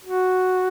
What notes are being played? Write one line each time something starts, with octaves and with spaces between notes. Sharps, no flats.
F#4